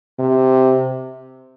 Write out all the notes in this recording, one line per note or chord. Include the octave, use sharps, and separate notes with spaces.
C3